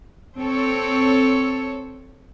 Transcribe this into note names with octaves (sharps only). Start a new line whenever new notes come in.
C4 A4 C#5